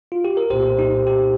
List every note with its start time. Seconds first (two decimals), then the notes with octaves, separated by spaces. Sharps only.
0.12 F4
0.25 G4
0.37 A#4
0.50 C2 A#2 A#3 G4 C5
0.79 D#4 G4
1.07 D#4 G4